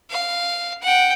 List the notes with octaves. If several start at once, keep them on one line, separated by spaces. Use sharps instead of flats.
F5
F#5 G5